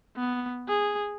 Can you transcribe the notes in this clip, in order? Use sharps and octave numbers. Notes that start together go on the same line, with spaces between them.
B3
G#4